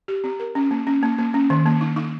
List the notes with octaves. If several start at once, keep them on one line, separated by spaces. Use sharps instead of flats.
G4
C4
A#4
C#4
A#3
C#4
A#3
A#3
C#4
D#3
A#3
D#4
D#4